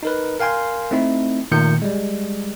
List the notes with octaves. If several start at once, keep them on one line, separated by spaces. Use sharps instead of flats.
D#4 A#4 B4
A#4 F5 G5 G#5 C6
A3 C4 D#4 E4
A#2 D#3 A3 G6 C#7
G3 G#3